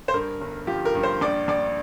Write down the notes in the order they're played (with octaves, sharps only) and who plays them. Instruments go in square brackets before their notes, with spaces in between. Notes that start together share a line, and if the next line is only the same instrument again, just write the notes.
[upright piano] C5
G2 A#4
G1
F3 G4
A#4
G2
C5
A#1 D5
A#1 D5